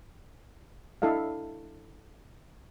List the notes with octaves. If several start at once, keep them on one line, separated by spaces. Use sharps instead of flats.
D4 E4 A4 D#5 F5